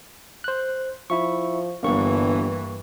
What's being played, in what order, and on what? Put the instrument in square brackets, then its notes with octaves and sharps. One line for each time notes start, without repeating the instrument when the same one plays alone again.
[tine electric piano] C5 F#6
[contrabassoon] F3 [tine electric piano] E4 E5 C#6
[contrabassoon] G1 [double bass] G2 E3 [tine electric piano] A#3 C#6